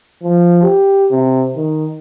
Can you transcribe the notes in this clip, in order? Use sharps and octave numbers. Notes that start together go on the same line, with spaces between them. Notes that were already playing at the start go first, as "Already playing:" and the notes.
F3
G4
C3
D#3